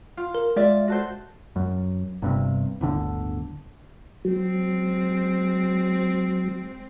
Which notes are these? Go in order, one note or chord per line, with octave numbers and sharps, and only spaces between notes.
F4
A#4
G#3 F4 D5 E5
F#4 A4 C5
F#2
G1 G2 C3
D1 G1 D3
F#3 G#3 C4